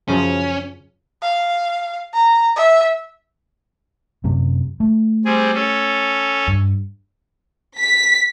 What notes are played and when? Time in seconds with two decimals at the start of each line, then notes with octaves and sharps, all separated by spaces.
0.08 F#2 C#3 F3 C#4
1.22 F5
2.13 A#5
2.56 E5
4.24 F#2 C3
4.80 A3
5.25 G3 C4 G#4
5.55 C#4 A4
6.48 G2
7.79 B6